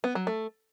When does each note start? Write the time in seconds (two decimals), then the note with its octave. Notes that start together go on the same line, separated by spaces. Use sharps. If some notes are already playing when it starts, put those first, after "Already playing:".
0.04 B3
0.15 F#3
0.27 A3